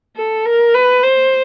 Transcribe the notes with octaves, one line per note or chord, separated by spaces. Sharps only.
A4
A#4
B4
C5